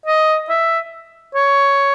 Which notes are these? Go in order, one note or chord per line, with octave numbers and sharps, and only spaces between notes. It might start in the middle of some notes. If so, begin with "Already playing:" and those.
D#5
E5
C#5